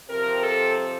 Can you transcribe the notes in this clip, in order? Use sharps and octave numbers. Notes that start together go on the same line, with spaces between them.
C3 F3 C4 A#4
A4